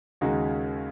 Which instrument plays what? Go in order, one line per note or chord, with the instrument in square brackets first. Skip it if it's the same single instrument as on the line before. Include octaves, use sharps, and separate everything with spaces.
[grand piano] D#2 C#3 G#3 D#4 F#4